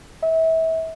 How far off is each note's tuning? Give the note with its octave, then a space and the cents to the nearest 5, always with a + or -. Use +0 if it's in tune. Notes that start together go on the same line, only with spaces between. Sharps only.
E5 -30